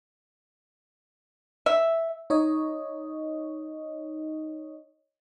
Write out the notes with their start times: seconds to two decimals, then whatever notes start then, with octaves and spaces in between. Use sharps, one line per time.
1.66 E5
2.30 D#4 C#5 D#5